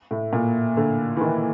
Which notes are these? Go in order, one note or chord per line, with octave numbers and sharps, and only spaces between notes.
A2
A#2
D3
E3
D#3